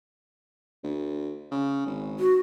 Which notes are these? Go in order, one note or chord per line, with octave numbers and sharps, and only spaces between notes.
D2
C#3
G#1
F#4